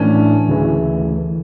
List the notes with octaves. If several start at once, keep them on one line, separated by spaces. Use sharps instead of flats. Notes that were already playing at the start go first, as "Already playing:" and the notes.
Already playing: A2 E3 A3 C#4 D4
D2 C#3 E3 A3